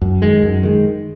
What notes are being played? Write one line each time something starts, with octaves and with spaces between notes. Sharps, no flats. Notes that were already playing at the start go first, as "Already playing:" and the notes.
F#2
D#3 G#3
F#2
D#3 G#3